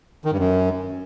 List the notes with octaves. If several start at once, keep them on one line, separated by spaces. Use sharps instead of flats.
D#3
G2
F#2